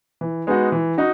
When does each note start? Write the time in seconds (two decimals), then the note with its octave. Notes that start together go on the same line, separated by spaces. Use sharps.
0.21 E3
0.47 G#3 B3 D#4 F#4
0.72 E3
0.98 D#4 F#4